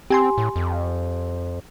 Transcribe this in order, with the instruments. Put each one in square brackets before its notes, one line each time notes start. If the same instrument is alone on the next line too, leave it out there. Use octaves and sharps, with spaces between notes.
[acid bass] C4 [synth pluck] G4 G#5 C6
[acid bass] A2
F2